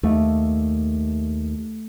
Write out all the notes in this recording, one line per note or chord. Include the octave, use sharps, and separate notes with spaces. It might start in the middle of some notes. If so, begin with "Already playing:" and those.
D#2 A3